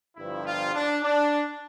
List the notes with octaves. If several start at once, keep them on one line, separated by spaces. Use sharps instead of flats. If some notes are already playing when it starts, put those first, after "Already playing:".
G1 G2 F3 E4
F4
D4
D4